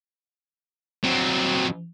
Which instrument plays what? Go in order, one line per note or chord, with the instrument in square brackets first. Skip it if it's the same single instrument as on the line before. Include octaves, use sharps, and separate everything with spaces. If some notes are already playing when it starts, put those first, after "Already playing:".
[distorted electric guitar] F#3 C4